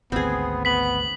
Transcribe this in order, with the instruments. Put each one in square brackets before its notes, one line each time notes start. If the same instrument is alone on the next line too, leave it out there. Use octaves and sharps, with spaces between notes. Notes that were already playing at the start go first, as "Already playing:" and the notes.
[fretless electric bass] G#1 D2 [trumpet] B3 [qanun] C4 G#4
[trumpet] B3 [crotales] B6 F#7